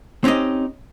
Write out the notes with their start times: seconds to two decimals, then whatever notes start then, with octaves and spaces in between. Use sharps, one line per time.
0.24 C4 C#4 D#4 G4 D#5